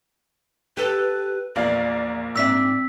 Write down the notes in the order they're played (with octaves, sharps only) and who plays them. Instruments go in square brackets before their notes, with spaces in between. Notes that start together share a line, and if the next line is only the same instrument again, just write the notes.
[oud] G4 A4 [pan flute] B4
[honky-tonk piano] A#1 A#3 F5 [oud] E2 [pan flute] D5
[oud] G#2 D4 E5 [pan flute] C4 [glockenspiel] E6 B6